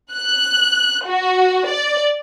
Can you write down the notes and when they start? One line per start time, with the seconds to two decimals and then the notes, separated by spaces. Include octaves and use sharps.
0.13 F#6
1.07 F#4
1.66 D5